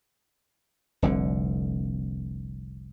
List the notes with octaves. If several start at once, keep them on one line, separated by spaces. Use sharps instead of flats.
F1 C2 D3